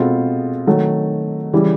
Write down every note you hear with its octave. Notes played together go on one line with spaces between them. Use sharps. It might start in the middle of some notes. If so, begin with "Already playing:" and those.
Already playing: B2 G#3 C4 F4 A4
D#3 F#3 A3
C#3 E3 G3